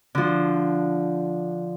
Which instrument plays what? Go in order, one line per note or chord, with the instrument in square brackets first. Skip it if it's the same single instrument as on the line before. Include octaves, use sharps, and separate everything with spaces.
[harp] D3 F3